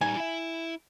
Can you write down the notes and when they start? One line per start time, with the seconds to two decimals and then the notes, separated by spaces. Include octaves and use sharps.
0.01 G3 D#4 G#5
0.17 E4 E5